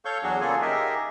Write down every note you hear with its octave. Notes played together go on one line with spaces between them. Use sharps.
A4 C#5 F5 C#6 G6
E2 F#3 D4 F#4 G#4
C#3 A#3 F4 G#4 A4 G#5
D#4 G4 G#4 A#4 D#5 E5